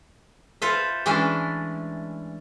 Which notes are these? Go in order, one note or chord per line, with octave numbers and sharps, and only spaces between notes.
F4 A4 B4 C5 E5
E3 G#3 A3 C#4 D4 E4